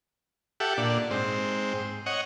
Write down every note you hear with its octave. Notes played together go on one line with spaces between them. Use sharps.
G4 A4 E5 F#5
A#2 D4
G#2 C4
C#5 D#5 F#5